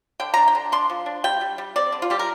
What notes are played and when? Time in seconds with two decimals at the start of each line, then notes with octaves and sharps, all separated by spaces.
0.20 D3 G5
0.34 D4 A#5
0.48 G5
0.55 D3
0.72 D4 C6
0.90 F3
1.06 D4
1.24 G3 G5
1.41 G3
1.58 G3
1.76 C4 D5
1.92 D3
2.02 F4
2.10 G3 G4
2.19 A#4